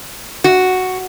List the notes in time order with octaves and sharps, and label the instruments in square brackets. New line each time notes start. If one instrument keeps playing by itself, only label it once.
[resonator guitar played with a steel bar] F#4